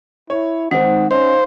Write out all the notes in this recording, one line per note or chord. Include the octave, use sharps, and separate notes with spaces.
E4 C#5
D#3 G#3 C4 D#4 C5 F#5
C#4 D#4 C5 F5